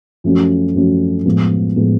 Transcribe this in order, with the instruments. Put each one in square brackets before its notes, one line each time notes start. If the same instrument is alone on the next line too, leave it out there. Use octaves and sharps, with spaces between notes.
[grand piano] F#2 F3 A3 C#4 F#4
F#2 F3 A3 C#4 F#4
A2 F3 G#3 B3
A2 F3 G#3 B3